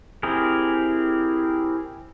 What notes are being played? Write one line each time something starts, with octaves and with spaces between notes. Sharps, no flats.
C4 E4 G4 G#4 A#4